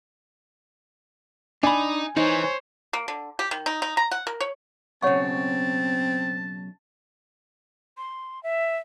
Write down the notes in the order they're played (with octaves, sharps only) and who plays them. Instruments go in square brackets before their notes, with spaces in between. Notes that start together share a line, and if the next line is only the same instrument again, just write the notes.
[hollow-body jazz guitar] D4 B5 [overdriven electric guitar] D#4 [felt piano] G#5
[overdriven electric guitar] E3 [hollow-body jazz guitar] D#4 [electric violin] C5 C#5
[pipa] A#3
D3
G4
D#3
D#4
D#4
A#5
F#5
A#4
C#5
[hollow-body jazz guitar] B1 C#3 [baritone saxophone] C4 [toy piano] C#5 F#5 C#6 [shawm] A5
[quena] C6
E5